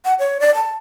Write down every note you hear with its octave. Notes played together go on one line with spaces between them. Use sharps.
F#5
C#5
D5
A5